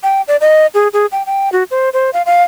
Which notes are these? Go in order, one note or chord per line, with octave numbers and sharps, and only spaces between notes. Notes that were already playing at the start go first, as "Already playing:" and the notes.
G5
D5
D#5
G#4
G#4
G5
G5
F#4
C5
C5
F5
F5